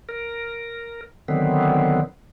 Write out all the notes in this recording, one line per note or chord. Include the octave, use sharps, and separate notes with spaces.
A#4
D3 D#3 F#3 B3 C4